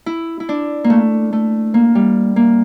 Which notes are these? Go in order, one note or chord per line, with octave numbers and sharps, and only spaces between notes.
E4
E4
D4
A#3
A3
A3
A#3
G3
A#3